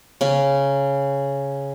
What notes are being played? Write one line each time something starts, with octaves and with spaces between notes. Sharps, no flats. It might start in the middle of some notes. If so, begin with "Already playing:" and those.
C#3 C#4